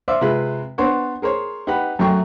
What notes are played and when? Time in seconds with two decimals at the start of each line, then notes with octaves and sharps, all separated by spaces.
0.08 C5 D5 E5 F5
0.21 C3 G#3 F4 B4 B5
0.78 B3 D4 C5 C#5 F#5
1.22 G#4 A#4 C5 C#5
1.67 D#4 G4 B4 F#5 B5
1.99 F#2 F#3 A3 G5 C#6